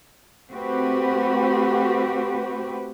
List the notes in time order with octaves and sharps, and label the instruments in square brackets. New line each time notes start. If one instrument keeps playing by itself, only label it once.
[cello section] A3 C4 F#4 G4 B4